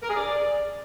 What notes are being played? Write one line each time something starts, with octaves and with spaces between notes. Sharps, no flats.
A#4
G#4
D5